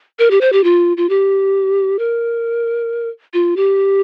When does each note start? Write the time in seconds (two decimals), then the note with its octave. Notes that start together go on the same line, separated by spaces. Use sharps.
0.19 A#4
0.31 G4
0.41 C5
0.52 G4
0.64 F4
0.97 F4
1.09 G4
1.99 A#4
3.34 F4
3.56 G4